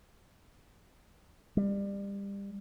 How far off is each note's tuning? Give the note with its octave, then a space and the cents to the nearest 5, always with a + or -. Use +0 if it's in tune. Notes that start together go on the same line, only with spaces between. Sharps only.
G3 +25